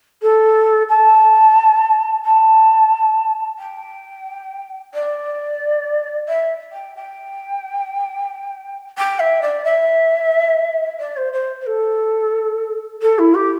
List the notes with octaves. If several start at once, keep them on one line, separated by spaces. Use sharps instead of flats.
A4
A5
A5
G5
D5
E5
G5
G5
G5
E5
D5
E5
D5
C5
C5
C5
A4
A4
E4
G4